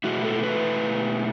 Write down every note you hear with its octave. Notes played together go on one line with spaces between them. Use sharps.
B2 A3 E4 F#4
A4
B4